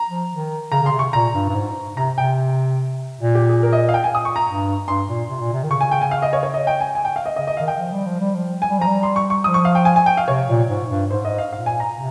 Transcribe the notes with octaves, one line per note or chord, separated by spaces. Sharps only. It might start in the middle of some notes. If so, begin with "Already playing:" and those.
Already playing: A#5
F3
D#3
C#3 A#5
C#3 C6
C3
C#6
A#2 A#5
G2
G2
G#2
C3 A#5
C3 G5
A#2
G4
G#4
A#4
D#5
F5
G5
G#5
D#6
C#6
A#5
G2
G2 C6
A#2
C3
A#2
C3
D#3
C#3 C#6
G#5
G5
G#5
F5
D#5
C#5
C#5
D#5
G5
G#5
G#5
G5
F5
D#5
C#3 D#5
D#5
D#3 F5
G5
F3
G3
F3
G3
F3
G#5
G3
F3 A#5
G3
C6
C#6
C#6
F3 D#6
C#6
F5
G5
G#5
G#5
G5
F5
C3 C#5
A#2
G#2
G2
G#2 C5
D#5
F5
A#2 F5
G#5
A#5
C3